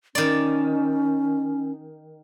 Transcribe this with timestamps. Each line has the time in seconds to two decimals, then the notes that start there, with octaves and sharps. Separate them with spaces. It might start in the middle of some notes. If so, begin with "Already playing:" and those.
0.15 D#3 C#4 D5